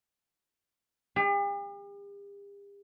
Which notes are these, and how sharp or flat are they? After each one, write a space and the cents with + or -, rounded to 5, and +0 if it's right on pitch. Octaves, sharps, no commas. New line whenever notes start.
G4 +45